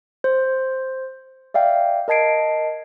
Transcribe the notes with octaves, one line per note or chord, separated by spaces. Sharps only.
C5
D5 E5 F5 G5
A#4 D#5 A5 G#6 C7 D7